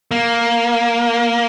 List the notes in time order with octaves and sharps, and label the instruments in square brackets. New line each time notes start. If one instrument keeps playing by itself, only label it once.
[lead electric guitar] A#3